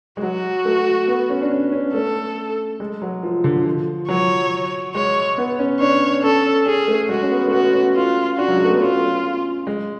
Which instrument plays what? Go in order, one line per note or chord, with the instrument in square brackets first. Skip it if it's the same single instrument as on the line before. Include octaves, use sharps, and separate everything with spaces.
[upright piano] G#3
[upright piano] F#3 [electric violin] F#4
[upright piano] A3
B3
C#4
D4
C#4
C#4
[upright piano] A3 [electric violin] A4
[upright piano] G#3
F#3
F3
D3
F3
[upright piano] F#3 [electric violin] C#5
[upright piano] G#3 [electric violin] C#5
[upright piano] B3
C#4
[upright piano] D4 [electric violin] C#5
[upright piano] C#4 [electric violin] A4
[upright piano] C#4 [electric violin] G#4
[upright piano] A3
[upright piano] G#3 [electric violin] F#4
[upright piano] C#4
B3
A3
[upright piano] B3 [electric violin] F#4
[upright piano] C#4
[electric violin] F4
[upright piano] D4 [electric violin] F#4
[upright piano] F#3
G#3
A3
B3
[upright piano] C#4 [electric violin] F4
[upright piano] G#3